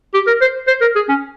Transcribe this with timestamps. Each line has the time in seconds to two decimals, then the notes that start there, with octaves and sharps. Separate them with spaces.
0.14 G4
0.27 A#4
0.41 C5
0.67 C5
0.81 A#4
0.95 G#4
1.09 C#4